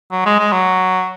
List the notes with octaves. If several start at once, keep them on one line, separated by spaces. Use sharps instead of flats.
F#3
G#3
G#3
F#3